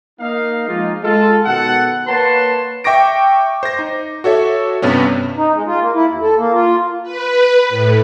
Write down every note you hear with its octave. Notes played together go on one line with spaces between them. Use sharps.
A#3 D#4 F5
F3 G#3 A#3 D#4 F4
G#3 F4 A4
B2 D#3 A4 F#5
A#3 B4 C#5 F#5 A5 C6
E5 G5 C#6 D6 A#6 D7
C5 A#6
D#4
F#4 A4 C#5 E5
G2 C3 B3 C#4
D#4
G#3
F4
A#3
E4
D#2
A4
A#3
F4
B4
A2